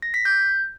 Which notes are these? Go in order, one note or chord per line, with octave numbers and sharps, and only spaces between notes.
A#6
B6
G6